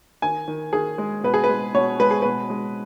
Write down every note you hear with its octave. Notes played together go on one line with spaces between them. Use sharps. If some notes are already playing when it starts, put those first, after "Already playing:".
D#3 G#5
D#3
D#3 G#4
G#3
B2 B4
G#4
B4
G#3
B2 C#5
G#3 B4
G#4
B2 B4
G#3